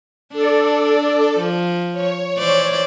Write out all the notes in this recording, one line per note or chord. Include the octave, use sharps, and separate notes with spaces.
D4 A4 D5
F3
C#5
E3 C5 D5